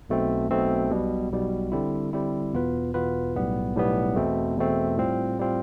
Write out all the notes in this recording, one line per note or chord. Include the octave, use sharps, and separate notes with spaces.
B1 B2 A3 C4
B1 B2 A3 C4
B1 B2 G3
B1 B2 G3
D3 G3 C4 E4
D3 G3 C4 E4
E2 B2 B3 F4 B4
E2 B2 B3 F4 B4
B1 A2 G3 B3
B1 A2 G3 B3
E2 B2 A3 C4
E2 B2 A3 C4
A2 G3 C4 F4
A2 G3 C4 F4